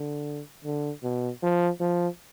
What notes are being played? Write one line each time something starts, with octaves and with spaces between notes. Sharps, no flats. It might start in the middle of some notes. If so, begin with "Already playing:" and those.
Already playing: D3
D3
B2
F3
F3